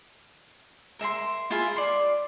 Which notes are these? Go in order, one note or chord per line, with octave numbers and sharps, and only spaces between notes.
A#4 E5 A#5 C6
E4 F4 G#4 A#4
D5 C6